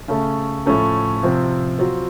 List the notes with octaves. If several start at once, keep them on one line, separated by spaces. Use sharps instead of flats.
C#3 A3 C#4 A4
A2 F3 A3 C#4 A4
C3 F3 C4
F#3 C4 F4